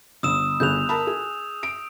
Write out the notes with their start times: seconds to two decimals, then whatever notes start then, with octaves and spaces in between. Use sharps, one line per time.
0.23 G1 D#6 E6 E7
0.60 G1 G#4 F#6 G6 F7
0.89 A#4 A5 B5
1.07 G#4
1.63 D7